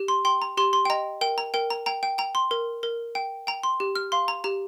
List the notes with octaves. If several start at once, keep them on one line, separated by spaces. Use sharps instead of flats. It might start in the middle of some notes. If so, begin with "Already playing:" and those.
Already playing: G4
C6
G5 C6
A#5
G4 C6
C6
G5
D#5 A#5
A#4 G5
A#5
A#4 G5
A#5
G5 A#5
G5
G5 A#5
C6
A#4
A#4
G5
G5 A#5
C6
G4
F6
F5 C6
A#5
G4 A#5